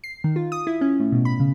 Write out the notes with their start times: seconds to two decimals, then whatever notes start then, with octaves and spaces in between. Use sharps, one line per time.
0.04 C7
0.24 D#3
0.36 F4
0.52 D#6
0.67 E4
0.81 C#4
1.00 A2
1.12 B2
1.25 B5
1.40 C#3